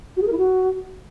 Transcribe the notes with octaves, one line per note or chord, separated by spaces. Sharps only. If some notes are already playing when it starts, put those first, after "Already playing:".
F#4
G#4
A#4
E4
F#4